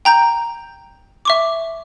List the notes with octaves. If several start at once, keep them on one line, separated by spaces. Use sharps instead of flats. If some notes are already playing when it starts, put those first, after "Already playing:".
G5 A#5 G6
E5 C#6 D6